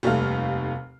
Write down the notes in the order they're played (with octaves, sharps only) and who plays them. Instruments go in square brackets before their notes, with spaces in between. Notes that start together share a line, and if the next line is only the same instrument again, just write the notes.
[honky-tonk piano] F1 D#2 G3 A3 F5 F6